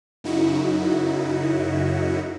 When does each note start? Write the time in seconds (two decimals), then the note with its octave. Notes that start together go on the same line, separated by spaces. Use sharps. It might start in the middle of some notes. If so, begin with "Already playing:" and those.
0.24 F#2 C#3 D#4 E4 F#4